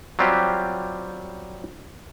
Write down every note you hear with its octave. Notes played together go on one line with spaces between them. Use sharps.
F#3 G3 C4 F4 G4